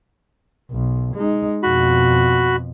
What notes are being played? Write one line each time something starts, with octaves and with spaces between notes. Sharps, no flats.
B1
G#3 D#4
F2 B2 F#4 B5